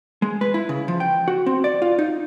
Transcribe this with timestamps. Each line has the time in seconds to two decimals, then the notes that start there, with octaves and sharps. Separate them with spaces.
0.22 G#3
0.41 B4
0.54 E4
0.69 C#3
0.88 F3
1.00 G5
1.28 F#4
1.46 C4
1.64 D5
1.82 F4
1.99 D#4